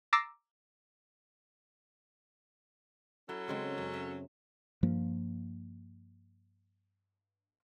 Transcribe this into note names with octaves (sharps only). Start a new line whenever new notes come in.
A#5 D6 E6 A6 A#6 C7
F#3 C#4 E4 A4
C#3 G#3 C4
F#2
E5
G2 F3 A#3